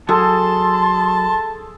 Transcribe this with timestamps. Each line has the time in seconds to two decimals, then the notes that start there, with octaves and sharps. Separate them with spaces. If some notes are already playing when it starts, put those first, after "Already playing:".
0.09 F#3 G#4 A4 A5 C6